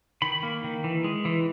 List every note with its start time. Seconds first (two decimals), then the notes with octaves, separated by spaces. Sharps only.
0.22 D#3 B5
0.43 A#3
0.64 D#3
0.84 E3
1.04 G#3
1.25 E3